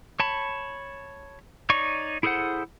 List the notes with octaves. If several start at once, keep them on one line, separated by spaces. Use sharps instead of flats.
C#5 A5 B5
D#4 C#5 D5 C#6
E4 G#4 A4 C5 F#5